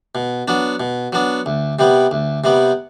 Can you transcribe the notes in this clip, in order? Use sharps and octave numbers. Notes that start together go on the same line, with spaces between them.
B2
F#3 B3 D4
B2
F#3 B3 D4
D2
C3 G3 B3
D2
C3 G3 B3